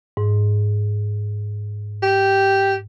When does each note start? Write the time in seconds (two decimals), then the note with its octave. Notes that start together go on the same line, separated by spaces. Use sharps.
0.17 G#2
2.03 G4